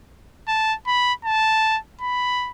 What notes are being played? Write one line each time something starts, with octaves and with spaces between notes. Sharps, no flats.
A5
B5
A5
B5